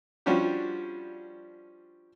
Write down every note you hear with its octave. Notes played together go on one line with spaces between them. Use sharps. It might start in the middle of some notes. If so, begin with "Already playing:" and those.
F3 G3 C#4 D4 F#4 G4